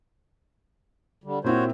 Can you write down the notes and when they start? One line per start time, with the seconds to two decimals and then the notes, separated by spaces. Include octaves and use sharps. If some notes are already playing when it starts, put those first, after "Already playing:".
1.24 D3 G3
1.44 A#2 C4 E4 F#4 C5 C#5